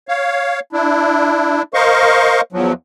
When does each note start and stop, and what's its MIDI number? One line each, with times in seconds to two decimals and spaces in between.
0.08 0.60 73
0.08 0.60 77
0.73 1.62 62
0.73 1.62 64
1.74 2.41 70
1.74 2.41 72
1.74 2.41 75
1.74 2.41 77
1.74 2.41 85
2.52 2.73 40
2.52 2.73 53
2.52 2.73 54